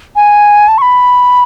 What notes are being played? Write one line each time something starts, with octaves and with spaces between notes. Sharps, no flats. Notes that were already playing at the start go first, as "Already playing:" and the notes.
G#5
A5
C#6
B5